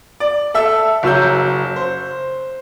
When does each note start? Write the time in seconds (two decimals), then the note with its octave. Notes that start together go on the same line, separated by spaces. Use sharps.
0.20 D5
0.54 A4 E5 E6
1.03 F#1 F#3 E6 G6
1.76 C5